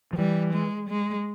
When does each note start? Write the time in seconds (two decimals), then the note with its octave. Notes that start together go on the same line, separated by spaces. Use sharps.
0.13 F3
0.17 E3 G3
0.53 G#3
0.89 G#3